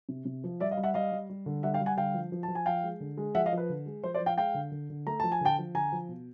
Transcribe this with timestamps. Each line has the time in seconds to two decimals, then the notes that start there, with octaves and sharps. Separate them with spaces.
0.09 C3
0.25 C3
0.44 F3
0.60 G3 D5 E5
0.71 D#5 F5
0.77 G3
0.83 E5 F#5
0.94 G3 D#5 F5
1.12 G3
1.29 G3
1.46 D3
1.63 G3 E5 F#5
1.74 F5 G5
1.80 G3
1.86 F#5 G#5
1.97 D3 F5 G5
2.14 F3
2.32 F3
2.43 A5
2.48 F3
2.55 G#5
2.66 F3 F5 G5
2.83 G#3
3.00 D3
3.17 G#3
3.35 F3 E5 F#5
3.46 D#5 F5
3.53 F3
3.58 B4
3.69 D3
3.86 G#3
4.03 F3 C5
4.14 C5 D5
4.20 F3
4.26 F5 G5
4.37 G#3 F5 G5
4.54 D3
4.71 D3
4.90 D3
5.07 A3 A#5
5.20 F3 A5
5.32 G#5
5.41 D3 G5 A5
5.58 F3
5.74 D3 G#5 A#5
5.92 F3
6.09 B2